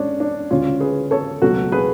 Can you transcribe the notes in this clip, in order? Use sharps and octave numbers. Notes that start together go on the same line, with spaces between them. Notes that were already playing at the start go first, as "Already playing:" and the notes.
Already playing: G#3 C#4 D4
D4
D2 C#3 G#3 C#4 F4
G#4 B4
A4 C#5
C#2 B2 F#3 A3 F#4 A4
G#4 B4